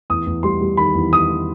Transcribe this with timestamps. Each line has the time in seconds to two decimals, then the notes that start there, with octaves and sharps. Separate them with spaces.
0.10 E2 D#6
0.27 E2
0.43 G3 C6
0.61 G3
0.77 D#3 B5
0.95 E2
1.12 D#3 D#6
1.30 D#3